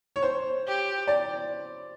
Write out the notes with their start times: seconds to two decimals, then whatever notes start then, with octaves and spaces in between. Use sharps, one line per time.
0.16 C#5
0.23 C5
0.68 G4
1.07 D5